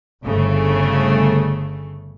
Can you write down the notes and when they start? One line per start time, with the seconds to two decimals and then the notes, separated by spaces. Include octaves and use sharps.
0.23 G1 C#3 A3